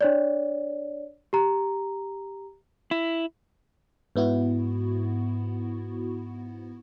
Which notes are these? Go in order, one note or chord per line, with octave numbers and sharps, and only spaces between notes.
D4 C#5 D5
G4 A#5
E4
G#2 B3 E4 F#4